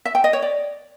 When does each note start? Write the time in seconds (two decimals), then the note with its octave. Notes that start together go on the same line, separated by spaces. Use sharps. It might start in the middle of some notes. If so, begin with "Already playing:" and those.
0.05 E5
0.15 G5
0.24 D#5
0.33 C#5
0.42 D5